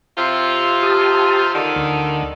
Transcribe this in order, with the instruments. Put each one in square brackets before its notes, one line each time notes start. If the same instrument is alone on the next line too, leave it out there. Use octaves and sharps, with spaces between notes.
[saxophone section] C3 F4
[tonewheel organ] G4 A5 D#6
[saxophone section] D3 D#3
[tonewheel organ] D2